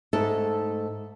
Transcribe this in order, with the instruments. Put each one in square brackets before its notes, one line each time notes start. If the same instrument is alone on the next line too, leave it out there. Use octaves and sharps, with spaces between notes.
[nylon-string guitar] G#2 A3 D#4 A4 E5